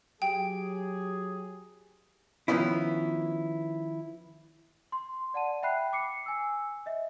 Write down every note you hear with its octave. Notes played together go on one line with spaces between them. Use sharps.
F#3 G4 G#4 G5
D#3 F3 B3 C#4 E4
C6
D5 F#5 A5 D#7
E5 G5 B5 F#6 C7
D6 C7 C#7
G#5 E6
D#5 E5